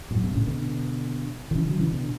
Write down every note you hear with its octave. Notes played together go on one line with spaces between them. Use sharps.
F#2 A2
G2 B2
A2 C#3
B2 D3
D3
C#3 E3
D3 F#3
C#3 E3
B2 D3